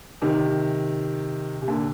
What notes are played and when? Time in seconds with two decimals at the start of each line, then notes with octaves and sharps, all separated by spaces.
0.22 C3 D#3
1.62 C3
1.68 A#2 D3